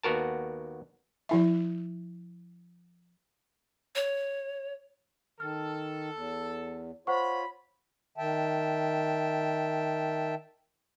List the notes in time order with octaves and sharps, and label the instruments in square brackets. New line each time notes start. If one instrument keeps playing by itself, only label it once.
[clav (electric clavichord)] D#2 B3 F#4 A#4 A5
[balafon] F3 E4 E5
[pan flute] C#5
[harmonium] D#3 [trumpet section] A4 [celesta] F6
[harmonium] E2
[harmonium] F4 C#5 [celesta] C5 F#5 C#6 [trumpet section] B5
[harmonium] D#3 E5 G5 A5